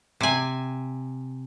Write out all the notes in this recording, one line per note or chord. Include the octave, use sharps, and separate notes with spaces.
C3 G#5